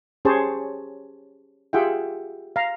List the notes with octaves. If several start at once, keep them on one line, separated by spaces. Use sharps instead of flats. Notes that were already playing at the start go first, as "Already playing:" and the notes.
C#4 G4 G#4 C5 C#5 A5
F4 G4 G#4 E5 F#5 G5
F5 A#5